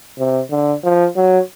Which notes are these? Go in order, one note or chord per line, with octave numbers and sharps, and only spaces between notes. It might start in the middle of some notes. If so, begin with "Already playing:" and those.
C3
D3
F3
F#3